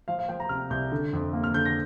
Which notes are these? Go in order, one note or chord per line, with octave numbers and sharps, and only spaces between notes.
F3 F5
F5
F3 G5
A#5
C3 F6
C2 G6
D3
F2
A#3
F6
D3 G6
A#6